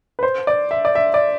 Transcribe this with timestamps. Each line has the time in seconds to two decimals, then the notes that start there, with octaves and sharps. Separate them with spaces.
0.19 B4
0.23 C5
0.47 D5
0.71 E5
0.85 D5
0.95 E5
1.14 D5